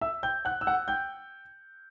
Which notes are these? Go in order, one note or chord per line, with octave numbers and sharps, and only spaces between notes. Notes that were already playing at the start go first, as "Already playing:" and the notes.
E5 E6
G5 G6
F#5 F#6
E6
F#5 F#6
G5 G6